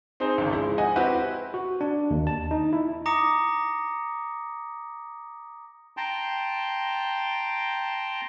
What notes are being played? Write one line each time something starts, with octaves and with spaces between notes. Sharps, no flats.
C4 D#4 G#4 C5
G#1 C#2
F3 G#3 E4
D#5 F#5 G#5
C4 E4 F#4 G4 B4
F#4
D4
D#2
A5
D#4
E4
A#5 D6 D#6 A#6 C#7
G5 A5 A#5 C6